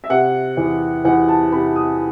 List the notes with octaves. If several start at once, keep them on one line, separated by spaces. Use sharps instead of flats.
E5
C3 F#5
E2
E2 F#5
A5
C3 B5
D#6